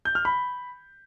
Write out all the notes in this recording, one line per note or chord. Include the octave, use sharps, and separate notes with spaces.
G6
F6
B5